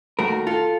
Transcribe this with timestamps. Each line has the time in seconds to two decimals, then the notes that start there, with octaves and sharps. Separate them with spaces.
0.19 D#2 D#3 A3 F#4 A#4
0.47 F4 A4